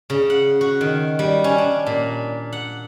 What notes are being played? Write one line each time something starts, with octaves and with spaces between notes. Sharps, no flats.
C#3
F#5
F#4
D#3
G3
C#4
D4
A#2
F#5